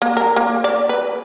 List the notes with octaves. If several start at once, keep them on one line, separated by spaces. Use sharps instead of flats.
A#3
A#4
A#3
D5
B4